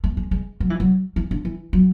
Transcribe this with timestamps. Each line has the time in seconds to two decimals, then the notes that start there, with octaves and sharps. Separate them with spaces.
0.04 A3
0.17 G#3
0.31 G#3
0.60 F#3
0.70 E3
0.80 F#3
1.16 E3
1.31 D3
1.45 E3
1.73 F#3